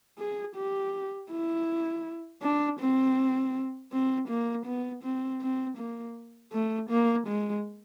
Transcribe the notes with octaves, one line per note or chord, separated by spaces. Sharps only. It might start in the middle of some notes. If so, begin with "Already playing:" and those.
G#4
G4
E4
D4
C4
C4
A#3
B3
C4
C4
A#3
A3
A#3
G#3